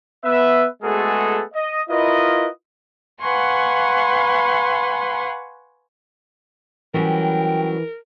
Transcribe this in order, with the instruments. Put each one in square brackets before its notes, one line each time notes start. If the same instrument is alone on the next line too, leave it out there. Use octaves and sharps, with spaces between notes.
[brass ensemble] B3 B4 E5
G#3 A3 B3 F#4 G#4 A4
D#5
E4 F4 A#4 B4 D#5
[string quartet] B4 F5 F#5 G#5 C6 C#6
[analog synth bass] E3 [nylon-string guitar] F#3 G3 C#4 [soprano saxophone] A#4 [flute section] G5